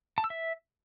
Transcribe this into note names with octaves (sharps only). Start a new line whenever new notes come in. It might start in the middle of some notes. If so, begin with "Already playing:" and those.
A5
E6
E5